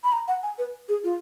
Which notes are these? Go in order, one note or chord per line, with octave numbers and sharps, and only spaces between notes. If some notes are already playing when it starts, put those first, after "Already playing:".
B5
A#5
F#5
G#5
B4
G#4
F4